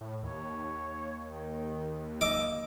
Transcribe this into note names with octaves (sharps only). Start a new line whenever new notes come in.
A2
D#2 C#5
D#3
A#3 D#5 D6 E6